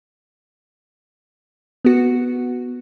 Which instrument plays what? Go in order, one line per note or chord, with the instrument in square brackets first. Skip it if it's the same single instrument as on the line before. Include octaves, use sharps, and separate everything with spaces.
[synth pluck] B3 F#4